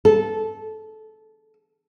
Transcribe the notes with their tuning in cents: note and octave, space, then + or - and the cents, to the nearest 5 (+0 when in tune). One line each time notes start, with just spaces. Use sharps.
A4 -15